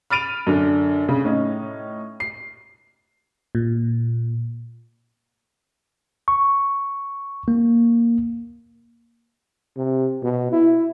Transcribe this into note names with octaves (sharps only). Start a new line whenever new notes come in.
B5 F6 A6 D7 D#7 F7
F#2 D3
C#3
A2 C#4 D#4
C7
A#2
C#6
A#3
C3
B2
E4